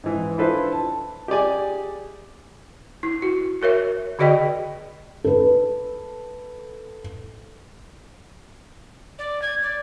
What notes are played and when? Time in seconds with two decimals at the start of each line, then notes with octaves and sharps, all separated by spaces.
0.04 G#2 E3
0.37 D4 E4 F4 A4 B4 C5
0.72 A5
1.28 G4 G#4 D5 G#5
3.03 E4
3.22 F#4
3.62 F#4 A#4 C#5 E5
4.19 D3 F#4 G#4 D5 D#5 G5
5.24 A4 B4
9.18 D5
9.42 G#6
9.62 D5